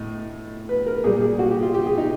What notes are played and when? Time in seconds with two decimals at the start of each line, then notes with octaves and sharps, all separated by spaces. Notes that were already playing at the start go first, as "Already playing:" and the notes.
Already playing: A2 D#5
0.69 B4
0.86 A#4
1.04 A#2 G#4
1.07 G3
1.21 G#4
1.39 F#4
1.51 G4
1.63 F4
1.74 G4
1.86 G#4
1.98 D#4